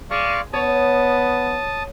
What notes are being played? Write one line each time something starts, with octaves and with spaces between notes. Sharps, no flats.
G#3 D5 F5 C#6
B3 C#5 A5 D#6